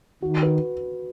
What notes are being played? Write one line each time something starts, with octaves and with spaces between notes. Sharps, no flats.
D#3 F#4
B4